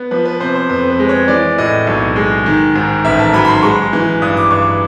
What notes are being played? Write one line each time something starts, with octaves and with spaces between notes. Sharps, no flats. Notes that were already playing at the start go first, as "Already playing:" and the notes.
Already playing: B3
F3 B4
B4
C3 C5
C5
F2 B4
B4
G#3
C#5
E3 D5
A2 D#5
B1
G#3
D#3
G#2
A1 E5
A5
F#3 B5
B5
C6
G#3 C#6
E3
G2 D#6
D6
G2 C#6